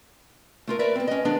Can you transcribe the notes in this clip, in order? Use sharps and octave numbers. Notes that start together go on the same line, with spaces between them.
A3 F4 A#4
A#4 B4 D5 E5
B3 C4
C#4 D#5
D#3 F3 G#3 B3 D4